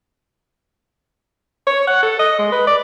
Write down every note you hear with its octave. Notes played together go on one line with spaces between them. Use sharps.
C#5
F#5
A4
D#5
G#3
B4
D5